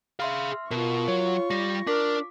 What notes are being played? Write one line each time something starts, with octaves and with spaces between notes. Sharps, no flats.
G#4 E5 F5 C6 F6
B2 F4 A#4 C#6
F#3 C#5
G3 A#6
D4 A#4 D6 B6